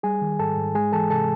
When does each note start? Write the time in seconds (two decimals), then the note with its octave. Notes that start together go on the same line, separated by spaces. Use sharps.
0.03 G3 G#4 G#5
0.22 D#3
0.39 G#2 A4 A5
0.57 G#2
0.75 G#3 G#4 G#5
0.92 E3 A4 A5
1.10 C3 A4 A5